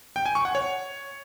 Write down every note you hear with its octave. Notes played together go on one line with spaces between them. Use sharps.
G5
G#5
C#6
F#5
C#5